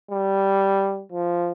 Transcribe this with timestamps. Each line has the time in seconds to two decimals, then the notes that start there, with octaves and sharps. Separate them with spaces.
0.11 G3
1.12 F3